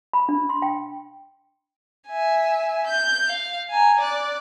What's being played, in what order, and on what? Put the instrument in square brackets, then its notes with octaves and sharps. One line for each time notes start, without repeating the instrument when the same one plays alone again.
[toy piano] B5
D4
C6
G5
[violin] E5 G#5
G6
F5
G#5 A#5
D5 F#6